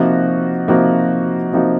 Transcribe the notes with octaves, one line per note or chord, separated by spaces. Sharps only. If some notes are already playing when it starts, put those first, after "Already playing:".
Already playing: C3 F3 A#3 D#4 F#4
C3 F3 A#3 D#4 F#4
C3 F3 A#3 D#4 F#4